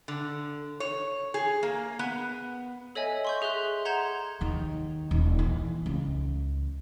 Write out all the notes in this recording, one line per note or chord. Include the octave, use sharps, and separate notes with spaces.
D3
C#5
G#4
A#3
B3
A4 C#5 D#5 E5 G#5
C6 C#6 G6
G#4 E5 C6 F#6
F#5 A#5 C6 G6 G#6 E7
D#2 D#3
D#1
E3
C#2